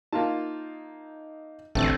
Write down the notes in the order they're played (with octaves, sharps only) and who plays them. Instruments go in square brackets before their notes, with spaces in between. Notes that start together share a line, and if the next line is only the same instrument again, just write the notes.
[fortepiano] A#3 F4 A5 [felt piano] D#4
[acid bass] A1 [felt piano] D3 C4 [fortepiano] A3 A4